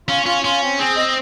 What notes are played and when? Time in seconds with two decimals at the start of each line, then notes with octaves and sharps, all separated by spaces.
0.09 C#4 F4
0.26 C#4 F4
0.44 C#4 F4
0.62 C4
0.79 C4 G#4
0.97 D#5